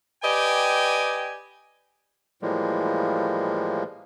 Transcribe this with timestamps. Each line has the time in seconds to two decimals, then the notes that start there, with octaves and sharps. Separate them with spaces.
0.23 G4 B4 D5 D#5 G5 G#5
2.42 A2 E3 F3 G3 G#3 A#3